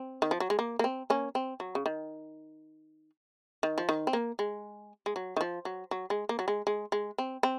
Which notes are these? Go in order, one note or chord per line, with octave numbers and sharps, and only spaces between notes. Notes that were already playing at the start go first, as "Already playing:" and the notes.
Already playing: C4
D#3
F3
F#3
G#3
A#3
A#3
C4
A#3 C#4
C4
F#3
C#3
D#3
D#3
F3
D#3
C4
A#3
G#3
G#3
F#3
D#3
F3
F#3
F#3
G#3
A#3
F#3
G#3
G#3
G#3
C4
C4